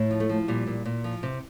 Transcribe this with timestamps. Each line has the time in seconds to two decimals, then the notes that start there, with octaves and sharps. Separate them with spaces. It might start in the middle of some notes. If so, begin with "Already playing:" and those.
Already playing: A2
0.11 F3
0.20 A3
0.29 F3
0.48 A#2 G3
0.67 A#2
0.85 A#2
1.04 F3
1.23 C3